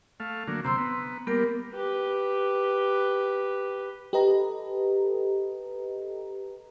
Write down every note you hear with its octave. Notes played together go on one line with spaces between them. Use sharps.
A3 F5
D3 F#3 A#3
C3 C4 A#5 C6 E6
B3
G3 A#3 B3 A#4
G4 B4
G4 A4 B4 D#5 A#5